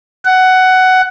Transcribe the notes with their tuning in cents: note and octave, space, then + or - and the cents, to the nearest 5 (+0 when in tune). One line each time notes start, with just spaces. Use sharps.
F#5 +10